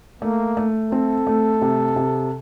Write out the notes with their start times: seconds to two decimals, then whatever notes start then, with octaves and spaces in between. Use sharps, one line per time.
0.22 A3 A#3
0.57 A3
0.91 C4 A4
1.27 A3
1.61 C3
1.96 C3